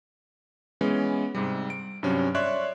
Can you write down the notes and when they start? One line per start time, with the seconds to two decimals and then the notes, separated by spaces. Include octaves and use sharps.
0.81 E3 G#3 B3 C#4
1.35 G#2 C3 G3
1.70 D7
2.03 G2 C3 F#3 C#4
2.35 C#5 D5 E5 C6 C#6 F#6